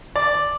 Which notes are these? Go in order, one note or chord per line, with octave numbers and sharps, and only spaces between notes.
D5